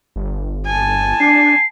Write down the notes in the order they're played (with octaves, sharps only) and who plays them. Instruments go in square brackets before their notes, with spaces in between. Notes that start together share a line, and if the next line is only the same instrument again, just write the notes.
[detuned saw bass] G1
[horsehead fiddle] G#5 A5
[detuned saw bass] D4 [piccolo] C7